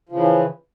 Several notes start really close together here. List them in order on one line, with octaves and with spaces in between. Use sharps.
F3 C#3 E3